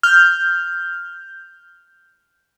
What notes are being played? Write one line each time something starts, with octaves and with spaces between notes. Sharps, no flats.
F6 G6